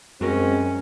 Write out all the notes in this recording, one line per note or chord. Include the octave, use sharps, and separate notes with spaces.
F#2 G#3 C4 C#4 F#4 A#4